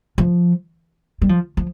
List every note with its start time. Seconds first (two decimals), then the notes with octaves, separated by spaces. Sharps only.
0.18 F3
1.22 G3
1.29 F3
1.57 F3